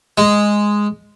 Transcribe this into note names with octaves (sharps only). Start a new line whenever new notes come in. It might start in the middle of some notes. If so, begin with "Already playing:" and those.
G#3